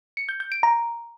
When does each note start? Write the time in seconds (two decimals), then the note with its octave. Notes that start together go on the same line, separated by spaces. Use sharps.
0.17 C#7
0.29 G6
0.40 G6
0.52 D7
0.63 A#5